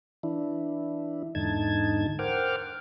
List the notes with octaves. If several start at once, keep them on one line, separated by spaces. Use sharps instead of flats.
E3 D4 E4
E2 G#2 D3 D#4 A5 G#6
A#4 C5 F#5 G5 D6 F6